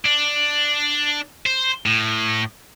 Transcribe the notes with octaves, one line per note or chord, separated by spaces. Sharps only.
D4
C5
A2